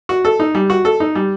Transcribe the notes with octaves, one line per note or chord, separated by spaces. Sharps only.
F#4
A4
D#4
G3
F#4
A4
D#4
G3